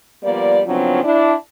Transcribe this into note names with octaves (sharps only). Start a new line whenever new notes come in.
F3 G3 A#3 B3 D5
C#3 F3 F#3 B3 C4 D4
D4 E4